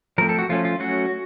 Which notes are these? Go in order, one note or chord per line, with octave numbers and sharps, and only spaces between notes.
F3 A3 C4 A#4
A4
F#4
F3 A3 C#4 F4
F4
F#3 A3 C#4 F#4